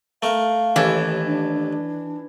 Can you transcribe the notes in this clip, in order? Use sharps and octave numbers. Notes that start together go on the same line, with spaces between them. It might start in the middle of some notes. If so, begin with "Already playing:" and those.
A3 A#4 F5
A1 D#2 E3 A4
D4